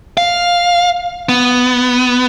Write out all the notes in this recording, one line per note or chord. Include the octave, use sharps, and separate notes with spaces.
F5
B3